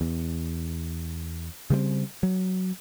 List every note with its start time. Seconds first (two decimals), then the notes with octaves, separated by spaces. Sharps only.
0.01 E2
1.70 C#3 G3 G#3 C4
2.23 F#3